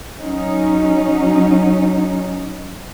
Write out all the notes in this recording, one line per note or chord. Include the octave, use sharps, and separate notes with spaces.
F#3 C#4 D#4